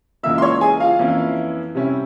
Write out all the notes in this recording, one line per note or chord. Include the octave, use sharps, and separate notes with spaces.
C#2 C#3 E3 A#3 E4 E5 E6
C6
C#5 C#6
G#4 G#5
F4 F5
F2 E3 A#3 C#4 E4
C3 G3 C#4 E4